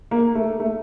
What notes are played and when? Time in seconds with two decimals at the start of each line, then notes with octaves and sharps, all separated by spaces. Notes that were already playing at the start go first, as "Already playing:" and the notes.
0.11 A#3
0.35 A3
0.60 A3